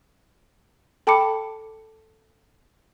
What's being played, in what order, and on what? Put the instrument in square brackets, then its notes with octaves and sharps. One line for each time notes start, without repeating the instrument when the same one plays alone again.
[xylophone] A4 G5 A5 B5 D6 C#7